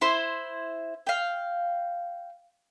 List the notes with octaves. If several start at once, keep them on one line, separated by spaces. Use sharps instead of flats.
E4 C5 C6
F5 G5